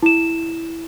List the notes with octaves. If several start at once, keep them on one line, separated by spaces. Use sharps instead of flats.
E4 E7